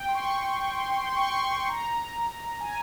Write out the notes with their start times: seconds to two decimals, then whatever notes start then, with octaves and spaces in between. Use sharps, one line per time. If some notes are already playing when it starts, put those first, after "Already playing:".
Already playing: G5
0.08 C6
0.15 C#6
0.46 C#6
0.77 C6
1.07 C6
1.16 C#6
1.24 C6
1.37 C6
1.69 A#5
2.60 G#5